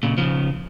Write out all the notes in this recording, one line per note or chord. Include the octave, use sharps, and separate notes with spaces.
A#2 C#3
C#3 F3